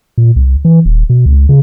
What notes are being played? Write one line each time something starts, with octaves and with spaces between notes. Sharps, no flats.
A#2
C2
E3
D#1
B2
C#2
C#3